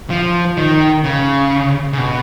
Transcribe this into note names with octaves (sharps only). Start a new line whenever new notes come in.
F3
D#3
C#3
C#3
B2